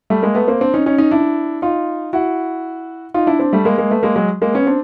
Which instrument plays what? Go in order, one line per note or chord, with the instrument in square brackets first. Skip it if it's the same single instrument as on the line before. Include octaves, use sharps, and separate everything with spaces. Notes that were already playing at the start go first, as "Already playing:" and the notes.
[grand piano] G3 A3
G#3 A#3
A3 B3
A#3 C4
C4 D4
C#4 D#4
C#4 D#4
C#4 D#4
D4 E4
D#4 F4
E4 F#4
D#4 F4
D4 E4
C4 D4
G3 A3
G#3 A#3
G#3 A#3
A3 B3
G#3 A#3
F#3 G#3
G#3 A#3
B3 C#4
C4 D4